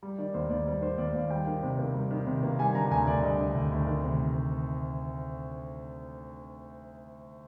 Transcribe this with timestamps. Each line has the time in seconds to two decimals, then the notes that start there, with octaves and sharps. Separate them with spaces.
0.03 G3
0.18 D#3 D5
0.34 D#2 C5
0.50 D#2 D5
0.67 G3 D5
0.82 D#3 C5
0.98 D#2 D5
1.14 D#2 F5
1.30 G3 G5
1.47 D#3
1.63 C3
1.78 A#3
1.94 G3
2.11 D#3
2.27 C3
2.43 A#3
2.59 G3 G#5
2.75 D3 A#5
2.91 D2 G#5
3.07 D2 D5
3.23 G3 D#5
3.39 D3
3.55 D2
3.72 D2
3.87 D#3
4.04 C3